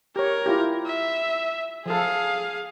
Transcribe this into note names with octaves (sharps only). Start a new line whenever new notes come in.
G4 A#4 C#5
E4 F4 G4
E5
F3 G#4 A4 F5